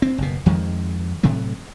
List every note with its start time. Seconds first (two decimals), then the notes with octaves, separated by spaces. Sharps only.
0.02 C4
0.18 F#1 B2
0.46 F2 D#3 F3 G#3
1.23 A2 C3 F#3 A3